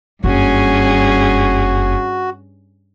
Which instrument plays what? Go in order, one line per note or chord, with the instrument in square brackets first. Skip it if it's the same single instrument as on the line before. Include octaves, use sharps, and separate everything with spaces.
[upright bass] F#1 [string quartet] G2 C#4 G#4 [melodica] F#4